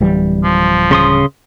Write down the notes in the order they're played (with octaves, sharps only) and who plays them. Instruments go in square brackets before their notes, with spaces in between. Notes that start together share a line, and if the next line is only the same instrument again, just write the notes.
[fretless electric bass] D1 E3 G3
[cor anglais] F3
[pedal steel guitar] C#3 C6 D#6